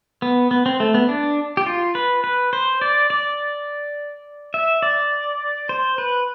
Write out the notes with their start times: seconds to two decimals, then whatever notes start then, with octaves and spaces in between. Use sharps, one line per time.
0.22 B3
0.51 B3
0.66 C4
0.80 A3
0.94 B3
1.09 D4
1.57 G4
1.66 F4
1.95 B4
2.24 B4
2.53 C5
2.81 D5
3.10 D5
4.54 E5
4.82 D5
5.69 C5
5.98 B4